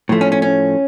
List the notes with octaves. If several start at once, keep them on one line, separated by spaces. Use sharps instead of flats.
A2 F3 A3
C#4
C#4
C#4